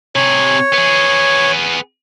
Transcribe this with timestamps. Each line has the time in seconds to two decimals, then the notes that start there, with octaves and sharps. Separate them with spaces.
0.16 C3 G#4 C#5
0.73 B3 G#4